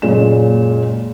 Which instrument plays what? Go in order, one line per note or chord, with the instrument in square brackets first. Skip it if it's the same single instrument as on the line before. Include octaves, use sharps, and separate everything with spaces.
[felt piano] F#1 A#2 G#3 C#4 E7